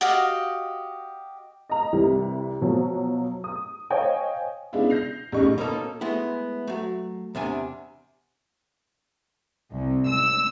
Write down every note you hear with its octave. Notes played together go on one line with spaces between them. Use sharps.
F#4 G4 D#5 F5
D#5 A#5
C2 C3 E3 G3
B2 F3 F#3
D#6
C5 C#5 D#5 F5 G5 G#5
C#3 G#3 B3 D4 E4 F4
G6 A#6 C7 F7
A1 F#2 G3 G#3 D#4 C#6
B2 A#3 C#4 D#4 A4
G#3 A3 B3 E4
F#3 A3
E2 C3 D4 G#5
C2
E6